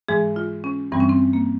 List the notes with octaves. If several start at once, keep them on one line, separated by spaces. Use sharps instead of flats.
G#2 E3 G#3 G#4
F4
C#4
G2 E3 G3 C4
C#4
C4
A#3